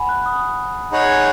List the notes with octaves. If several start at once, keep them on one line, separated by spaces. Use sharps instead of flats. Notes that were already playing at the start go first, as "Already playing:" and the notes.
Already playing: F#5 G#5 B5
F#6
D#6
D#4 G#4 C#5 F#5 B5
G#5